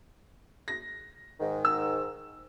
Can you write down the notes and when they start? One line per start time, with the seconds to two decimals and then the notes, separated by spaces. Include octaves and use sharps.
0.68 A#6
1.40 G#2 D#3
1.65 E6